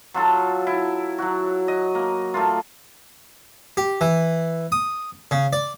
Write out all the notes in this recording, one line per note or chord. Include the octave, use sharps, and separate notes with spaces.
F#3 F4 A4
E4
F#3 F#4
D#5
A#3
A3 A#3 F4
G4
E3
D#6
C#3
D5